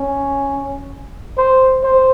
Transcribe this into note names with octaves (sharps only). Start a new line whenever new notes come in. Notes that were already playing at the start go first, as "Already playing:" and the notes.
Already playing: C#4
C5
C5